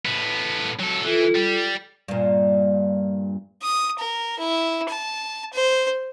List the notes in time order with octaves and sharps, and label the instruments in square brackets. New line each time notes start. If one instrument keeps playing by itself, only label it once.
[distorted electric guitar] A2 B3
F#3 A4
[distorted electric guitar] E3 [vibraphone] F4 A4
[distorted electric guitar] G3
[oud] G2 A#2
[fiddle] D#6
A#4
E4
A5
C5